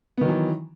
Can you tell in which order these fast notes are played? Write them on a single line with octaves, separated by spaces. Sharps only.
B3 D#3 F#3 E3